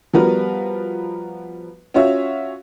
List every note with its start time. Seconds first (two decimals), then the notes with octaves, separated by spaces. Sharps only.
0.13 F3 G3 B3 F#4 A#4 B4
1.94 C#4 F4 F#4 C#5 E5